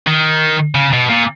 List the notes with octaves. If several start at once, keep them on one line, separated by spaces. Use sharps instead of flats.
D#3
C#3
B2
A#2